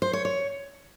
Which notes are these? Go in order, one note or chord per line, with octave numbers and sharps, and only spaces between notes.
C5
C#5
C#5